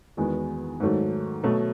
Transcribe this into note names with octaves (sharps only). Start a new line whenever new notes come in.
E2 D#3 G#3 B3 F#4
G#2 D#3 F#3 A3
B2 F#3 A3